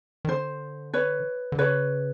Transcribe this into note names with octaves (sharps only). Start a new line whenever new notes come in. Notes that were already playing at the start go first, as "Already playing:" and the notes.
D#3
D3 C5
B4 C#5
D3
C#3 B4 C#5